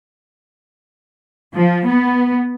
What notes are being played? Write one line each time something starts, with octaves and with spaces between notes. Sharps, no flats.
F3
B3